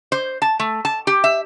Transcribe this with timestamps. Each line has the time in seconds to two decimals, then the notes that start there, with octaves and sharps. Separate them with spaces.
0.12 C5
0.42 A5
0.60 A3
0.85 A5
1.07 G4
1.24 E5